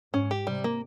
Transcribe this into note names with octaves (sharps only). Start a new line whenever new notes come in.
G#2 C#4
G4
C3 G3
A#3